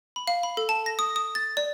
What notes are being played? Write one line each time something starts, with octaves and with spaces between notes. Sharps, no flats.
B5
F5
B5
A4
A5
A#6
D#6
D#6
A6
D5